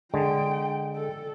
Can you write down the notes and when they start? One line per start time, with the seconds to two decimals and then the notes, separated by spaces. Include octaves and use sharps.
0.14 D3 G#3 G5
0.96 A4